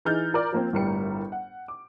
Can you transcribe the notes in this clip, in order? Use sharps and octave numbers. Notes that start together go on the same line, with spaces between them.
E3 D#4 G#4 F6 G6 A6
F4 A#4 D5
F3 A#3 C4
G1 A2 G3 A#4 C#7
F#5
D6